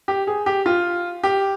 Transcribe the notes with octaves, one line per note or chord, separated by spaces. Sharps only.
G4
G#4
G4
F4
G4